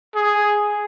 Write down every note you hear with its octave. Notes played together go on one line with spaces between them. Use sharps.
G#4